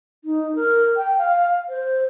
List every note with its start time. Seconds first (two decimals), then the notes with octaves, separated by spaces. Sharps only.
0.24 D#4
0.55 A#4
0.97 G5
1.18 F5
1.69 C5